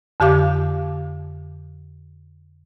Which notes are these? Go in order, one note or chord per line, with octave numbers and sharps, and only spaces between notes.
F2 D3 G4 F5 D6